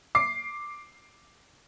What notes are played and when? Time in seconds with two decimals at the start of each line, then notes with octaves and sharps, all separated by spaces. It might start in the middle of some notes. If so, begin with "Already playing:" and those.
0.15 D6 C7